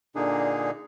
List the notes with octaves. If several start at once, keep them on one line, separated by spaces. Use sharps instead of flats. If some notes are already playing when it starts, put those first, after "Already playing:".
A#2 D3 A#3 D4 D#4 G#4